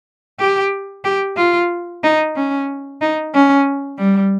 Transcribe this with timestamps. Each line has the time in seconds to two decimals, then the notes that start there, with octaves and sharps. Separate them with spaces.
0.40 G4
1.05 G4
1.37 F4
2.03 D#4
2.36 C#4
3.01 D#4
3.34 C#4
3.98 G3